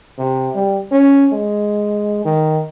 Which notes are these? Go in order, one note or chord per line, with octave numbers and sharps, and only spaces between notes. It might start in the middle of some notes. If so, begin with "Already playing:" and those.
C3
G3
C#4
G#3
D#3